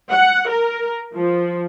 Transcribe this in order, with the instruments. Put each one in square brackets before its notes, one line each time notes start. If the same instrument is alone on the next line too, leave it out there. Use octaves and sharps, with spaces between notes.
[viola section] F#5
A#4
F3